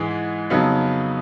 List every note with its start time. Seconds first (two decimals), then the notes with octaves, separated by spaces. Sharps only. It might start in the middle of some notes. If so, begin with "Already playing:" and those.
Already playing: G#2 E3 G#3
0.50 F2 C#3 F#3 B3 D#4